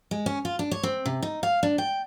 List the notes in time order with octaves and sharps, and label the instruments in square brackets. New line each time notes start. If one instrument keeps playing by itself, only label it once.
[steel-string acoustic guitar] G#3
C#4
F4
D4
C#5
C4
C3
D#4
F5
D4
G5